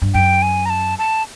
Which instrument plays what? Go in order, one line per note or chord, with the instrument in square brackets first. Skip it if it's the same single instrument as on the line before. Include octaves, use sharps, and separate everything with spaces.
[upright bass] G2
[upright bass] F#2 [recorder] G5
[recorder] G#5
A#5
A5
A5